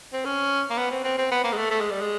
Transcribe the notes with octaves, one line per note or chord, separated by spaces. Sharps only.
C4
C#4
A#3
B3
C4
C4
C4
B3
A#3
G#3
A3
A3
G#3
G3
G#3